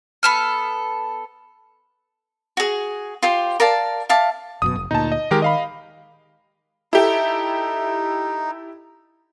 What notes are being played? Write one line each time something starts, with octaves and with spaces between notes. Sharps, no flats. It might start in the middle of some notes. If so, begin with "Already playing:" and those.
B3 A4 F6
F#4 G#4
F4 G4 C5
A#4 D5 F5 A5
E5 F5 A5 D6
G1 F#2 B2 D#6
F1
D2 A#2 D#4 A5
D#5
D#3 G#3 G4 A#4
D#5 F5 B5
D#4 E4 G4 A4